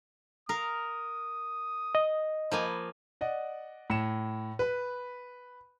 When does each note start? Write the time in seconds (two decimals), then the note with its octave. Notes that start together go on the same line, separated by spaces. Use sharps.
0.49 A#4 F5 D#6
1.95 D#5
2.52 F3 A#3 G#5 B5
3.21 D5 D#5 F#5
3.90 A2 C#7 E7
4.59 B4 B5